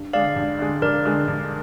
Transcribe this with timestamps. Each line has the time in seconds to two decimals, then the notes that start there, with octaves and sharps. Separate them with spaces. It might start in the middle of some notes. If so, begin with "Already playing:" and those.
Already playing: G2
0.13 D3 G#3 D5 F5
0.36 G2
0.59 D3 G#3
0.82 G2 A#4 D5
1.06 D3 G#3
1.28 G2